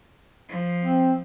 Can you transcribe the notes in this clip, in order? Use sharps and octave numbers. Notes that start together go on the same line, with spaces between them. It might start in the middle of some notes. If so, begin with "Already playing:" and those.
F3
C4